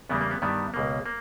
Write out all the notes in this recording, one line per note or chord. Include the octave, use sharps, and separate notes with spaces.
E2 C#3 G3 A#3 B3
A#3
B3
G2 D#3 G3 B3
C#2 B2 A#3
A#3